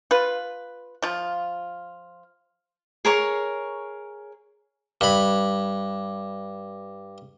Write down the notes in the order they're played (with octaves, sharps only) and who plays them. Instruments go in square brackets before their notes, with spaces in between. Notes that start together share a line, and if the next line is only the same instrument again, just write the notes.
[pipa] F4 B4
F3 F4
[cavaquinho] G#4 A#4 C#5 C#6
[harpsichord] G2 B5